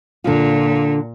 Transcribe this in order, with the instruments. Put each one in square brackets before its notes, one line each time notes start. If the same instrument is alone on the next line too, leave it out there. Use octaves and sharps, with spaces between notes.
[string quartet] A#2 [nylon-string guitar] D3 F4